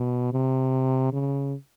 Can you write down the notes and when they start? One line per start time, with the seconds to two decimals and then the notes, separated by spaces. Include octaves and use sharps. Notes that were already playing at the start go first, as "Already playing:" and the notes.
Already playing: B2
0.32 C3
1.13 C#3